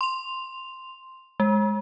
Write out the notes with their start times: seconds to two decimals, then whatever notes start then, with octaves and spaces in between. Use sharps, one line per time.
0.01 C6 F7
1.40 G#3